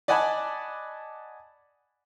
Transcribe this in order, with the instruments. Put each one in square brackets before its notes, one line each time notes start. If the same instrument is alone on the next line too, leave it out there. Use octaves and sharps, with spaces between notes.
[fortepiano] D5 D#5 F#5 G#5 A5 B5